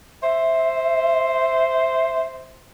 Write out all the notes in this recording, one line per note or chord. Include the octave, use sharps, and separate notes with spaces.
C5 E5